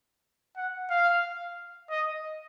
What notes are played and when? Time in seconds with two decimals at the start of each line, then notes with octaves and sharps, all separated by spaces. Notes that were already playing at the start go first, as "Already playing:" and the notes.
0.57 F#5
0.90 F5
1.90 D#5